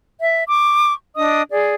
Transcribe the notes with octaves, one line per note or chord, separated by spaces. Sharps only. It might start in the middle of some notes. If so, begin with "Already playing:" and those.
E5
C#6 D6
D4 D#5 D#6
G#4 D5